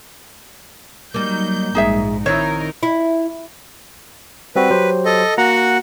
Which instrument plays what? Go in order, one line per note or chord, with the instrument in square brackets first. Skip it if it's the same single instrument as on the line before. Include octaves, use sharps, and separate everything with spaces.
[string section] F#3 D#4 G6 [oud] G3 A#3
[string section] A#1 G#2 [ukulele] D#4 G#4 E5
[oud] D#3 C4 E4 [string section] D#4 A#4 [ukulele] C#5
[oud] E4
[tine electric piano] G3 C4 F#4 [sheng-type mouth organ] B4
[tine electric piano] F#3 G4 C5
[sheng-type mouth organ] A4 D#5
[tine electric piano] A#3 A#5 [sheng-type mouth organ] F#4 F#5